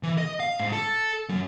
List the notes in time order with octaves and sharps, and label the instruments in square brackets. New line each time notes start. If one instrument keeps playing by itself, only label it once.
[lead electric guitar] E3
D#5
F5
G#2
A4
F#2